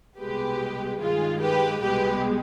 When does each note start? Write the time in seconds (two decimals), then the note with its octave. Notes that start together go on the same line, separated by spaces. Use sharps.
0.19 C2 B2 G#3 G4 B4
1.00 G2 D#3 G#3 F4 G#4
1.40 G4 B4
1.82 C2 B2 G#3 G4 B4